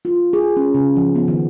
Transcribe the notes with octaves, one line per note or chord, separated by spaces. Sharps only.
F4
G#4
C#4
C#3
F3
B3
D#3